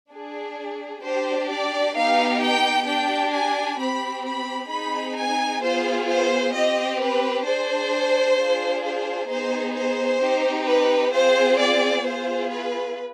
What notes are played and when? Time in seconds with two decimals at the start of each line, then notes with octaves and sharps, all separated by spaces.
0.11 D4 G#4
1.03 D4 G4 C5
1.49 D5
1.96 B3 D#4 G4 F5
2.42 G5
2.86 D4 G4 G5
3.33 G#5
3.79 C4 G4 B5
4.25 B5
4.70 C4 D#4 G#4 B5
5.16 G#5
5.62 B3 F4 G#4 C5
6.08 C5
6.54 C4 G4 D#5
7.00 B4
7.45 D4 G#4 C5
8.38 D4 F4 G#4
8.84 C5
9.29 B3 D#4 G#4 C5
9.75 C5
10.21 C4 D#4 G4
10.67 B4
11.13 C4 F4 G#4 C5
11.60 D5
12.04 B3 F4 G#4 C5
12.51 B4